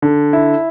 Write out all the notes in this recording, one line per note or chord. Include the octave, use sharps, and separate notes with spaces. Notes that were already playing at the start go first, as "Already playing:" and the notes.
D3
E4